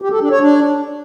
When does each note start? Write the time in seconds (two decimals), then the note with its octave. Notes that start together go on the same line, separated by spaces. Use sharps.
0.02 G4
0.11 A4
0.21 D4
0.31 C#5
0.41 D4